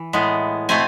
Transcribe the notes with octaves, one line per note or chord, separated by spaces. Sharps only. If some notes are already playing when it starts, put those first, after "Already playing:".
Already playing: E3
A2 G#3 B3
B2 A3 C4 G#5